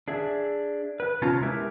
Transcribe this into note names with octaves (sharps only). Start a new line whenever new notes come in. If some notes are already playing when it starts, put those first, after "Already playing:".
D4 G#4 E5
B4
C3 B3 C#4 F4 A5 A#5
G#3 E4 G4 A#4 B4 E5